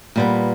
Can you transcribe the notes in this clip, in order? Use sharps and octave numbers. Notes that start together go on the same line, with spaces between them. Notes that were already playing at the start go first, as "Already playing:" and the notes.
A#2 G3 B3